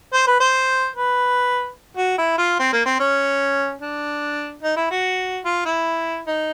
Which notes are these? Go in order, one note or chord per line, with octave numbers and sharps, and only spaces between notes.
C5
B4
C5
B4
F#4
E4
F4
C4
A#3
C4
C#4
D4
D#4
E4
F#4
F4
E4
D#4